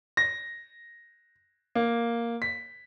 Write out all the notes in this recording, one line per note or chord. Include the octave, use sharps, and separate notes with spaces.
A#6
A#3
B6